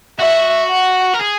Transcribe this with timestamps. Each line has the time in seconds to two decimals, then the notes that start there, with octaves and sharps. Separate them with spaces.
0.19 F#4 E5
0.69 F#5
1.14 A#4
1.20 G#4